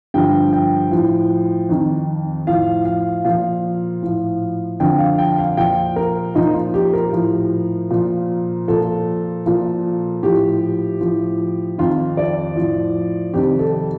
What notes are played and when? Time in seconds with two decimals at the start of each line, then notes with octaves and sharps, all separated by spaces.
0.14 G2 D3 F3 G5
0.53 G5
0.91 A2 F3
1.69 F2 D#3
2.47 A2 F3 F5
2.85 F5
3.24 A#2 F3 F5
4.02 A2 F3
4.80 F2 D3 F3 G5
4.99 F5
5.18 G5
5.38 F5
5.57 A#2 F3 G5
5.96 A#4
6.35 A#2 F3 D#4
6.54 F4
6.74 G4
6.93 A#4
7.13 A2 F3
7.91 A#2 F3
8.68 A#2 F3 A4
9.46 A#2 F3
10.23 A2 F3 G4
11.01 A2 F3
11.78 F2 D#3 F4
12.17 D5
12.56 A2 F3
13.34 F2 C3 D#3 G4
13.59 A4